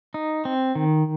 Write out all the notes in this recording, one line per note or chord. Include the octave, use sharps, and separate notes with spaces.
D#4
C4
D#3